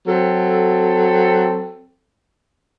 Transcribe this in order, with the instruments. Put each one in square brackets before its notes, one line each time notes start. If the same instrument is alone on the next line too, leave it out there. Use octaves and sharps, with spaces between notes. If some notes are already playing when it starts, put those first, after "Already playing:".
[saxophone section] F#3 C4 A4